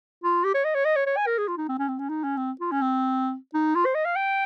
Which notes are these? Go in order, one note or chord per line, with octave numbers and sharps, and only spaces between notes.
F4
G4
C#5
D#5
C#5
D#5
C#5
C#5
G#5
A#4
G#4
F4
D#4
C4
C#4
C4
C#4
D#4
C#4
C4
F4
C#4
C4
D#4
F4
C5
D#5
F5
G5